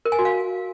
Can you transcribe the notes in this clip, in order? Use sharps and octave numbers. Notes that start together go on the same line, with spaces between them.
A#4
G#5
F#4
F5